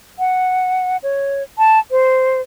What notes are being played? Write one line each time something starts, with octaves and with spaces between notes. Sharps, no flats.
F#5
C#5
A5
C5